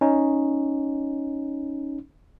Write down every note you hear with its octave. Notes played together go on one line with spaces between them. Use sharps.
C#4 D#4